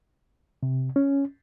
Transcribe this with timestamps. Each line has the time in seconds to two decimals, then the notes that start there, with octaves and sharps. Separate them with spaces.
0.63 C3
0.96 C#4